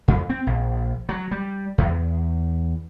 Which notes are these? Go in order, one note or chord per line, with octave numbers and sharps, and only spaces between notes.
F2
C4
A#1
F#3
G3
E2